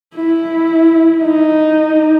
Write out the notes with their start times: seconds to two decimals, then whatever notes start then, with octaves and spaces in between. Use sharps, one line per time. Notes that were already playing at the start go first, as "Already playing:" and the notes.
0.15 E4
1.23 D#4